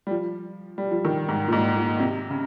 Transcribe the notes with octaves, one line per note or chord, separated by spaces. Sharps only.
G3
F3
G3
F3
D#3
G#2
A#2
G#2
A#2
C3
C#3